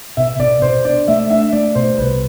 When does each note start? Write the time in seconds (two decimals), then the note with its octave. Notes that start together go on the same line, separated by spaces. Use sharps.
0.17 B2 E5
0.39 B2 D5
0.62 B2 C5
0.85 D4 D5
1.08 A3 E5
1.30 D4 E5
1.53 A3 D5
1.75 B2 C5
1.98 C2 B4